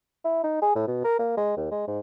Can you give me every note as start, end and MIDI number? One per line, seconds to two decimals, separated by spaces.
0.25 0.42 64
0.44 0.59 63
0.62 0.76 68
0.76 0.87 45
0.87 1.03 47
1.04 1.19 70
1.19 1.34 58
1.37 1.54 56
1.57 1.69 39
1.72 1.85 56
1.88 1.99 44